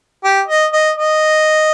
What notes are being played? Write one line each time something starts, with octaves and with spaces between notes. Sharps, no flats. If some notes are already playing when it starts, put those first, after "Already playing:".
G4
D#5
D#5
D#5